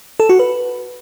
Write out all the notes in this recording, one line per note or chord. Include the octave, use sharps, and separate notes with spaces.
A4
F#4
B4